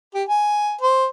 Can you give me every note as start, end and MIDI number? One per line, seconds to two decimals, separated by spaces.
0.15 0.24 67
0.28 0.74 80
0.81 1.06 72